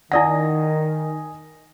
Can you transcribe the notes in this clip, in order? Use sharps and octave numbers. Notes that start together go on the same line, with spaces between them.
D#3 E4 D5 F#5 G#5 D#6 A#6